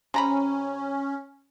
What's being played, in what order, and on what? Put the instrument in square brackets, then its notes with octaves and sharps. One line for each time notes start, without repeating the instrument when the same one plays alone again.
[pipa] C3 A#5 B5 [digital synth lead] C#4